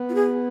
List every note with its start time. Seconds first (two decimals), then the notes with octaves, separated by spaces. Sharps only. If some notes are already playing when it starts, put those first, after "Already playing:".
Already playing: B3
0.09 F4
0.15 G#4